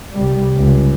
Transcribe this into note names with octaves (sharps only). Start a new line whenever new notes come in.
C2 G3
C#2